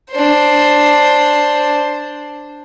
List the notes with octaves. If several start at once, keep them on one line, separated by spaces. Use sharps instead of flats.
D4 C5